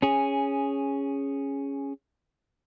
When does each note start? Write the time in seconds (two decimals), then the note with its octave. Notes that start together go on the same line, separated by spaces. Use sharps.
0.02 C#4 G#4